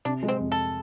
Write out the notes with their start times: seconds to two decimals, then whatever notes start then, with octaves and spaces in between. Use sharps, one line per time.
0.05 C3 D4
0.23 G#3
0.28 C4
0.40 F2
0.52 A4